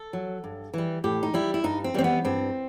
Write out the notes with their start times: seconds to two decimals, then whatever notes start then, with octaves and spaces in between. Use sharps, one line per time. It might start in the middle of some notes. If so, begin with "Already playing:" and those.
Already playing: A4
0.13 F#3
0.44 G2
0.74 E3 G3
1.04 A2 G4
1.23 D#4
1.34 G3 E4
1.54 E4
1.64 G2 D#4
1.84 C4
1.94 E3 G3 C4
2.04 B3
2.25 G2 C4